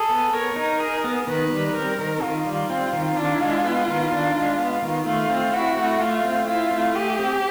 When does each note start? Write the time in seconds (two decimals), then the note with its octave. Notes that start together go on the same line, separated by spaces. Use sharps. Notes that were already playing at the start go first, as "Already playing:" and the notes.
Already playing: G#4 A4
0.10 B3
0.33 A#4 C#5
0.56 D#4
0.80 G#4
1.04 B3
1.27 D#3 B4
1.51 G3
1.75 C4 A#4
1.99 D#3
2.22 D#3 F4
2.46 G3
2.70 C4
2.93 D#3
3.17 D4
3.40 G#3
3.65 B3
3.88 D#3
4.11 D4
4.35 G#3
4.59 B3
4.82 D#3
5.06 A3 F4
5.30 C4
5.53 E4 F#4
5.77 A3
6.01 A3 F4
6.24 C4
6.47 E4 F4
6.71 A3
6.95 G4 G#4
7.19 C4